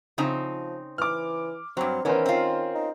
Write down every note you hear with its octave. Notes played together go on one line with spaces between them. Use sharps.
C#3 F3 C4 D#4
E3 D6 F6
G2 F#3 C4
D#3 E3 B3 C#4 A#4 C5
C4 F4
D#4